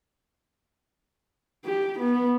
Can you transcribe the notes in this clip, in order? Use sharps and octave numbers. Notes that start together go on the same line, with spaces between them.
G4
B3